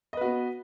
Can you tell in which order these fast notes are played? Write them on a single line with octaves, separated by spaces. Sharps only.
D#5 B4 F#4 B3